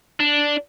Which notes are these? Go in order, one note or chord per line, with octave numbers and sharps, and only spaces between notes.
D4